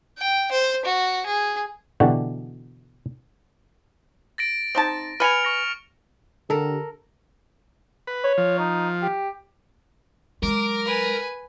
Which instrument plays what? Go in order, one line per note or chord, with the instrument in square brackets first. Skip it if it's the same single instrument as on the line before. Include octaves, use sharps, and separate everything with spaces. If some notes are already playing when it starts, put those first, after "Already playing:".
[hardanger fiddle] G5
C5
F#4
G#4
[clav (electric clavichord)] B2 D3 E3 F#4 G4 D5
[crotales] A6 A#6 D7
[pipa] C4 D#4 A5
[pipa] B4 G#5 [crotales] F6 C#7 F7
[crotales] C#6 A#6 C#7
[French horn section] D3 G4 [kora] A4 A#4
[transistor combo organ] B4
[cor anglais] C#5
[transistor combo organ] F3
[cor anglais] D#4
G4
[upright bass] F#3 G#3 [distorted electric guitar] A#4 [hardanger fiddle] D6
[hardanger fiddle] B4 G#5